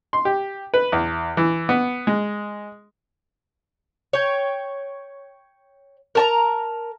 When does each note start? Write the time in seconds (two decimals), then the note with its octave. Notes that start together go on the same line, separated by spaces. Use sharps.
0.13 C6
0.25 G4
0.74 B4
0.92 E2
1.37 E3
1.69 B3
2.07 G#3
4.13 C#5 G5
6.15 A#4 A5 A#5